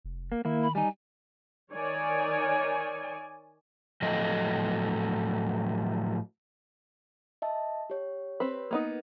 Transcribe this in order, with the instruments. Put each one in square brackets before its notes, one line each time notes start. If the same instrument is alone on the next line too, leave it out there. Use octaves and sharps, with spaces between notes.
[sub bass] F1
[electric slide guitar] A#3
[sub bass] D#3 [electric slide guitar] A#3 E4
[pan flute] B5
[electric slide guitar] G3 D#4 [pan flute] G#5
[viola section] D#3 C#5 D5 G#5
[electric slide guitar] A2 F3 F#3 A4 D#5
[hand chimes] D#5 E5 A5
G4 C#5
[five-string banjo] C4 B4
A#3 B3 D#4